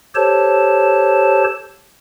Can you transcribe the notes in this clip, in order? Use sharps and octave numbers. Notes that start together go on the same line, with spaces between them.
G4 A4 C5 C#5 A5